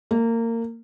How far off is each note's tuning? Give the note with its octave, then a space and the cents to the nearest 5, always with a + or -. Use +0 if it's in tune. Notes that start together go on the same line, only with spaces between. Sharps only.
A#3 -25